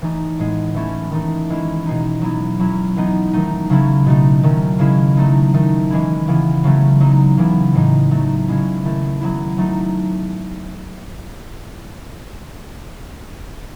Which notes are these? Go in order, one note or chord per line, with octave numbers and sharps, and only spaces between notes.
E3 A3 D#4
A2 G#3 B3
E3 A3 C#4 E4
D#3 A3 D#4
E3 G#3 C#4 E4
B2 G#3 D#4
F#3 B3 E4
F#3 C#4 E4
E3 G#3 B3 D#4
D#3 F#3 A3 D#4
C#3 F#3 A3 C#4 E4
B2 A3 D#4
D#3 F#3 A3 C#4
C#3 G#3 C#4 E4
F#3 A3 D#4
D#3 A3 D#4
E3 G#3 C#4 E4
C#3 E3 B3 E4
C#3 F#3 A3 C#4
F#3 B3 D#4
C#3 E3 B3 E4
A2 E3 G#3 D#4
F#3 A3 D#4
C#3 G#3 C#4 E4
D#3 A3 E4
F#3 B3 E4
F#3 A3 D#4